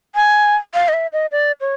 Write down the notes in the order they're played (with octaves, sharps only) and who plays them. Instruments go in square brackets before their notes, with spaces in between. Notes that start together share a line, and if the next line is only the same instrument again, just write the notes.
[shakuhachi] G#5
F5
D#5
E5
D#5
D5
C#5